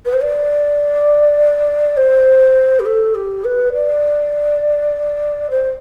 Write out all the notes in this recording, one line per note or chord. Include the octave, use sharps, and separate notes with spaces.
B4
C5
D5
C5
G4
A4
G4
B4
D5
C5